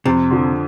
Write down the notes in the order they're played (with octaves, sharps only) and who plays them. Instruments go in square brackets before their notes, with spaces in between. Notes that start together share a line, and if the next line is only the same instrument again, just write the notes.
[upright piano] F2 [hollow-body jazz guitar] C3
[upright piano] D3 F3